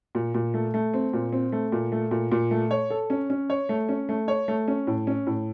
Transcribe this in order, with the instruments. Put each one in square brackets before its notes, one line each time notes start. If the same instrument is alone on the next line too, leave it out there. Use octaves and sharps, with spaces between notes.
[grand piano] A#2
A#2
A3
A3
C4
A#2
C4
A3
A#2
A3
A#2
A#2
A3
C#5
A4
C#4
C#4
C#5
A3
C#4
A3
C#5
A3
C#4
A2
C#4
A2